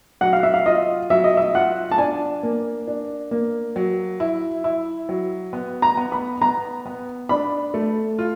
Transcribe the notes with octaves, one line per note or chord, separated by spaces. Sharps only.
F#3 F#5
F5
E5
F5
F4 D#5
F#3 E5
D#5
E5
F4 F#5
A5
D4 G#5
A#3
D4
A#3
F#3
E4
E4
F#3
B3
A#5
B3
B5
B3 A#5
B3
D4 B5
A3
F4